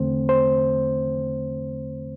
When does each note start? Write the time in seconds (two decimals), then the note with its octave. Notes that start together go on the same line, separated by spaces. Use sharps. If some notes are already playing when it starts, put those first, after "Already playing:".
Already playing: E2 D3 A3 C4 C5
0.29 C5